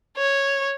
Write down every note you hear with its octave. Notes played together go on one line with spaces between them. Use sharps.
C#5